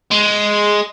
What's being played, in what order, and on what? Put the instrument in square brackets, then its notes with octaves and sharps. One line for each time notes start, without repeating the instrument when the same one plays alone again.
[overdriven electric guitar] G#3